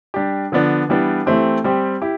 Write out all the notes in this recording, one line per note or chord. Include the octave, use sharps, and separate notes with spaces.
G3 D4 G4
D3 F3 B3 D4
E3 G3 B3 D4
E3 A3 C4 G4
G3 C4 G4
E4 G4